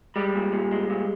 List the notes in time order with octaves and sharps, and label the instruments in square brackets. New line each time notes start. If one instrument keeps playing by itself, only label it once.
[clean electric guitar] G3 G#3 G4
A#2
A#2
G#3
A#2